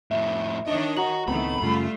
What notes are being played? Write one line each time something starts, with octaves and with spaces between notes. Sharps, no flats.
F2 A2 E5
D#3 D4 C#5 D#5
F#4 F#5 A#5 F#7
C#2 A2 D#3 A3 B3 C4 B5
F#2 C#3 G3 A3 C#4 F4